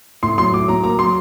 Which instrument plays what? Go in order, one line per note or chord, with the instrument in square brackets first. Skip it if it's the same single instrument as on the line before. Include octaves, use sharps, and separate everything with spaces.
[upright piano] A2 C6
F#3 C6
A2 D6
F#3 A#5
A#3 A#5
F#3 C6